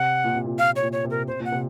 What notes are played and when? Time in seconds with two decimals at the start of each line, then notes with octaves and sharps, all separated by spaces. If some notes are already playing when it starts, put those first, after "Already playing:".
Already playing: C3 F#5
0.24 A#2
0.34 C3
0.45 A#2
0.58 A#2 F5
0.76 C#5
0.82 A#2
0.93 C#5
1.05 C3
1.10 A#4
1.28 C3 C5
1.40 A#2
1.45 F#5
1.52 C3